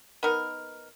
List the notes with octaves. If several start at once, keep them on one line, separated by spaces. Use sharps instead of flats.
B3 D#4 A#4